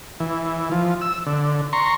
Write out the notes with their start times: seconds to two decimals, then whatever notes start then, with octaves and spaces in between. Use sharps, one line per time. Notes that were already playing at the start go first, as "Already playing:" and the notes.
0.20 E3
0.71 F3
1.01 E6
1.26 D3
1.73 A#5 C6 C#6